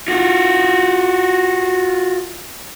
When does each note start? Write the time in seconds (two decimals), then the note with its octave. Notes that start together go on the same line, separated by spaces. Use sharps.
0.08 F4 F#4